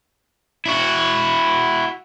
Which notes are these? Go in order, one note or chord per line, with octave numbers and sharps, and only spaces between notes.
E4 F#4